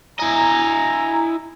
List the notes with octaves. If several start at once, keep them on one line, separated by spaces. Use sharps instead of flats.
E4 D#5 G#5 A#5